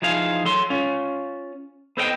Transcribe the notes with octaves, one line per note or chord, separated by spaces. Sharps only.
E3 F3 D#4 G#4 F5
F#3 A4 C6
C#4 F4
B3 A4 C5 D#5 F5 G5